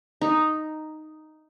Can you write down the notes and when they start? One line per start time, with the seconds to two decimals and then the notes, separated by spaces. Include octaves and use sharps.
0.21 D#4